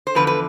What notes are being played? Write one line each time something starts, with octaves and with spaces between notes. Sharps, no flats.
C5
E2 D3 F3 B4
B4